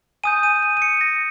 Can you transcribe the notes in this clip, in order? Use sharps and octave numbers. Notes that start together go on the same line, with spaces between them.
G#5 D#6 G6 D#7
D#7
D#7
D#7
C#7
A#6